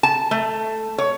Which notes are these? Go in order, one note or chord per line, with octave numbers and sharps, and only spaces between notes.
A5
A3
C#5